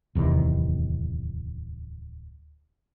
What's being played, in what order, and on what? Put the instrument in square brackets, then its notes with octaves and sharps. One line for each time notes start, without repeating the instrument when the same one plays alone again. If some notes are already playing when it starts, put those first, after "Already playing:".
[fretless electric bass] D1 E2 C3 D#3